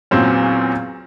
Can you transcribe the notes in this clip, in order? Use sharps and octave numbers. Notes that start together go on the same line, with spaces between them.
E2 A#2 F#3 C4 C#4